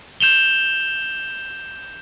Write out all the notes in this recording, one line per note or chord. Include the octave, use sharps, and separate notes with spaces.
G6 E7 F7 G7